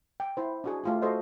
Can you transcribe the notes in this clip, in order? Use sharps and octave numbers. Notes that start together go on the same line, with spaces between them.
G5
E4 C5
D4 F#4 G#4
A3 F4 G4
F#4 A4 C5 D#5